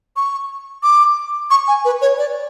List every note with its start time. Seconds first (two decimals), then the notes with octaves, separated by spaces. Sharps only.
0.16 C#6
0.83 D6
1.51 C#6
1.68 G#5
1.85 B4
2.02 C#5
2.18 D5